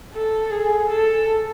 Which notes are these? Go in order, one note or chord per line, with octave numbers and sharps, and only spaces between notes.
A4
G#4
A4